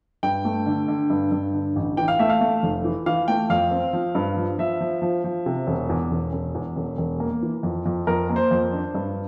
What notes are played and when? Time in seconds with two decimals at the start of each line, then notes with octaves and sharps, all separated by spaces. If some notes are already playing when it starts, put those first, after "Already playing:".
0.23 G2 G5
0.45 A3
0.66 D3
0.88 D3
1.10 G2
1.32 G2
1.53 D3
1.76 A1
1.97 E3 G5
2.08 F5
2.19 A3 E5
2.29 F5
2.41 A3
2.63 F1
2.85 E3
3.06 E3 F5
3.28 A3 G5
3.50 F2 F5
3.71 C4
3.93 F3
4.15 G2
4.37 F3
4.59 F3 E5
4.81 F3
5.02 F3
5.24 F3
5.46 C3
5.67 E1
5.89 E2
6.11 E1
6.33 E1
6.55 E2
6.76 E1
6.98 E1
7.20 A#3
7.43 E3
7.63 F2
7.86 F2
8.07 F2 A#4
8.29 A#3
8.36 C5
8.51 F2
8.73 D4
8.94 G2